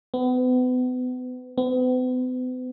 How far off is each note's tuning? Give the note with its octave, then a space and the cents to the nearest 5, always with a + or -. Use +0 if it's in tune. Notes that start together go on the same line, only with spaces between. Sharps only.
B3 +35
B3 +45